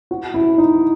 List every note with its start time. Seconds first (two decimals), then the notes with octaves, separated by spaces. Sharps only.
0.11 F#4
0.34 E4
0.58 D#4